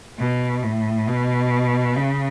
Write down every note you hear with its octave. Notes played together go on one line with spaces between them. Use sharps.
B2
A2
B2
C#3